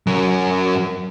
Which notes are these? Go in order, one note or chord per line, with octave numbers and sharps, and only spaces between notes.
F#2 F#3